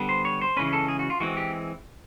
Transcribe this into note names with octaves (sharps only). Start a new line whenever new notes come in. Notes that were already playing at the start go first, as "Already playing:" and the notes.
Already playing: D3 G3 B3
C5
C#5
C5
C#3 E3 G#3 C#4 B4
A4
G#4
F#4
F4
E3 G#3 C4 F#4
G4